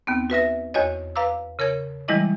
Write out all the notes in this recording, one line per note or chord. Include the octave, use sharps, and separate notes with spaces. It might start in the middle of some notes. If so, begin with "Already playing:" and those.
D#2 B3 C4
F#4 B4 E5 A#6
E2 F#4 C#5 D#5
B4 F5 A#5 D6 E6
C#3 A#4 C#5 G#6
E3 G3 G#3 E4 D#5 D6